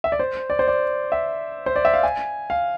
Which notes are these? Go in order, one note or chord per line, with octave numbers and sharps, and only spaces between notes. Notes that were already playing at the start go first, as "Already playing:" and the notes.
E5
D5
C5
D5
C5
D5
E5
C5
D5
E5
F5
G#5
F5